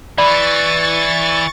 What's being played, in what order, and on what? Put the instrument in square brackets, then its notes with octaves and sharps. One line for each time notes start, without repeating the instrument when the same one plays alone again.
[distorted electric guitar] E3 [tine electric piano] D5 [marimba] B5 [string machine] C#6 A6